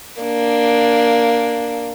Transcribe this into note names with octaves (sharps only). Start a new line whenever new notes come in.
A#3 D4